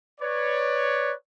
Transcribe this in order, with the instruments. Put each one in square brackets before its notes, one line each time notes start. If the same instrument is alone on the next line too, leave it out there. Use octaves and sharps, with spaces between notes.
[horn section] B4 C#5 D5